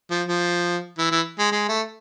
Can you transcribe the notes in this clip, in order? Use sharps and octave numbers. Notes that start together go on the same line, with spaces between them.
F3
F3
E3
E3
G#3
G#3
A3